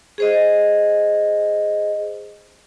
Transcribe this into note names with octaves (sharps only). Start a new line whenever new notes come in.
G#4 C5 D#5